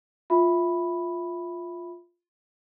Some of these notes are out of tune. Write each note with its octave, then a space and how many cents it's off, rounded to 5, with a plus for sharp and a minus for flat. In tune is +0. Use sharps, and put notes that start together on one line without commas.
F4 +0 E5 +0 B5 +0